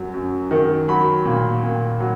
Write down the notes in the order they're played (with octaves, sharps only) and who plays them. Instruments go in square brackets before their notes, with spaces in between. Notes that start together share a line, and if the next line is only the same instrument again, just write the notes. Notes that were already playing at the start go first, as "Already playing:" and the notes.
Already playing: [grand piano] F#2 F#3
F#2
D#3
F#3 B5
A#2
A#2
F#3